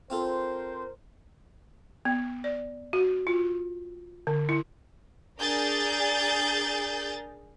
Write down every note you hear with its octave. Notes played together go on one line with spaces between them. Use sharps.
C4 F4 A4 A#4 C5
B3
D5
F#4
F4
D3
E4
D4 G#4 A#4 G6 A6